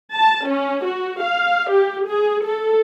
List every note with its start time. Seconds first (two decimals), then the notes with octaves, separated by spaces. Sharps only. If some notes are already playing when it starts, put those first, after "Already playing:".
0.14 A5
0.47 C#4
0.85 F#4
1.23 F5
1.71 G4
2.09 G#4
2.44 A4